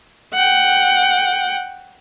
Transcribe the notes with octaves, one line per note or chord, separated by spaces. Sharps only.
F#5 G5